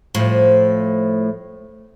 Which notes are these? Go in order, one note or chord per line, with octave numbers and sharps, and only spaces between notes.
A2 F3